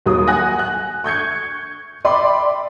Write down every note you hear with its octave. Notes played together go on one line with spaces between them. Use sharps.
D#2 F#3 D#6
F#5 G#5 F#6 A#6
F#6
C#6 G6 G#6 C#7
D5 E5 G5 B5 C6 D6